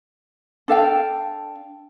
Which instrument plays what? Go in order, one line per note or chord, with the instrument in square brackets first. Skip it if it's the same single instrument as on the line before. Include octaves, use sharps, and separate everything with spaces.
[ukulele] D4 A4 F5 G5